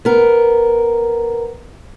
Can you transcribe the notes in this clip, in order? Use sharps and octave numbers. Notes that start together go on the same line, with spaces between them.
B3 A#4